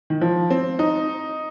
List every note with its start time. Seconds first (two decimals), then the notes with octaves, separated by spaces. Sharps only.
0.10 D#3
0.21 F3
0.50 C4
0.79 D#4